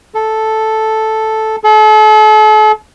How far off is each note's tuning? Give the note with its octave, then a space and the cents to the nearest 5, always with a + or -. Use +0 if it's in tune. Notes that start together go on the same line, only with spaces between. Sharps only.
A4 -5
A4 -40